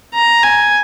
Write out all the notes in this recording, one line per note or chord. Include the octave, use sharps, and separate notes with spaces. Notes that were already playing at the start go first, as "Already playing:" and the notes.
A#5
G#5